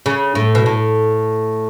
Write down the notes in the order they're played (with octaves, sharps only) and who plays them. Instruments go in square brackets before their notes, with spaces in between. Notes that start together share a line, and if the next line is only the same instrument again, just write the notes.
[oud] C#3
A2
B2
A2